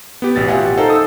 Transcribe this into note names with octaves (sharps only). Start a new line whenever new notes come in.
B3 G4
A1 B2 A6
F4 G4 E5 F#5 G#5
D#4 A4 A#4 C5
D#6 E6